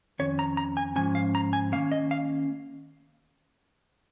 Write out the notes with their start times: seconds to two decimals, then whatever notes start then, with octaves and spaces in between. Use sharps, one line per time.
0.19 F2 D#3 C#4 C#5
0.39 A#5
0.57 A#5
0.77 G#5
0.96 G#2 F3 C#4 G#5
1.15 F5
1.35 A#5
1.53 G#5
1.72 D#3 A#3 C#4 F5
1.92 D#5
2.11 F5